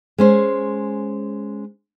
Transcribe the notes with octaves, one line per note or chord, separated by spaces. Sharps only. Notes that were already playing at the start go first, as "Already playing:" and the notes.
G#3 C#4 C5